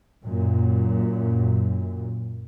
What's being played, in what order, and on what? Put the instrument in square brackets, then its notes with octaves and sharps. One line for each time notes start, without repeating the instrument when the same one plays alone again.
[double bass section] F#2 A#2